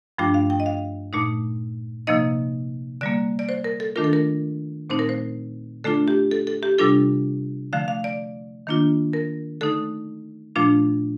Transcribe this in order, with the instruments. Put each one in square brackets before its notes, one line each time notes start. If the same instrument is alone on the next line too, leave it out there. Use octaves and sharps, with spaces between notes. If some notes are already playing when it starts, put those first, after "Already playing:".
[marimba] G2 F3 A3 D4 F4 G5
F5
G5
D#5
F5
A#2 A3 D#4
C3 F3 A#3 D#4 D#5
D3 G3 A#3 D5
D5
C5
A#4
A4
D#3 A3 D4 F4 A#4
A4
A#4
A#2 A3 C4 D#4 C5
A#4
C5
D3 A3 D4 F4 A4
G4
A4
A4
G4
C3 G3 D4 F4 A4
D3 F3 A3 F5
F5
D5
D#3 A#3 D4 F4
A#4
D3 A3 D#4 A4
A#2 F3 A3 D4 F4